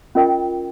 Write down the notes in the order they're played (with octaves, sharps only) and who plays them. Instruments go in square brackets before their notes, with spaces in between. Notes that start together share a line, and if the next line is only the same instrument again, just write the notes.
[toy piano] C#4 F4 A#4 D#5 G5